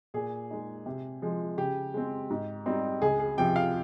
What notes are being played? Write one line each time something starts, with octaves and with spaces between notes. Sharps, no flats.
A#2 G#4
G#3 D#4
C3
F3 G#3
C#3 G4
G#3 C4
G#2
G3 C4 D#4
C#2 G#4
G#4
C3 F3 G5
F5